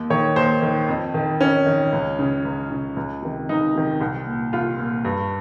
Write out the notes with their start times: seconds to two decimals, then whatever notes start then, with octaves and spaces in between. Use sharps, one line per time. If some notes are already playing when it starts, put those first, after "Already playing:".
Already playing: D#2
0.10 D#3 C#5
0.36 D#2 C5
0.62 D#3
0.88 F2
1.14 D#3
1.41 F2 C#4
1.66 D#3
1.93 C#2
2.19 C#3
2.45 C#2
2.71 C#3
2.96 C#2
3.23 C3 D#3
3.49 C#2 D#4
3.75 C3 D#3
4.01 C2
4.27 A#2
4.53 C2 F4
4.79 A#2
5.05 G2